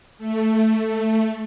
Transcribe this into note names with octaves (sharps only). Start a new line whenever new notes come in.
A3